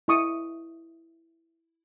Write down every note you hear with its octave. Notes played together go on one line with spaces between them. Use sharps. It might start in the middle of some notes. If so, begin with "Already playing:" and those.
E4 D#5 C#6 D#6